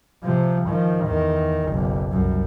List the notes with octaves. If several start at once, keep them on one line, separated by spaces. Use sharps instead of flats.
C3 F3
D#3 F3
E2 D#3
F#1 B1
C2 F#2